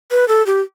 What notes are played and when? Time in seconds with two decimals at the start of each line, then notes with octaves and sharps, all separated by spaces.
0.11 B4
0.28 A4
0.47 G4